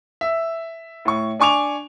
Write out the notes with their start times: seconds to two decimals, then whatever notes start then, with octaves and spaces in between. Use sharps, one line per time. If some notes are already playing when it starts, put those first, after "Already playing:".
0.21 E5
1.05 A2 C#6
1.40 D4 G#5 C#6 D6 F7